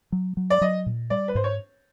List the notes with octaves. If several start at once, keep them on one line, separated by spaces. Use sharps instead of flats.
F#3
F#3
D5
F#3 D#5
A#2
G3 D5
B4
G#2 C5
C#5